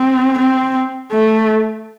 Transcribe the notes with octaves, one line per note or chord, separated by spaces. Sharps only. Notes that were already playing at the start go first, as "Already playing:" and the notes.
Already playing: C4
C4
A3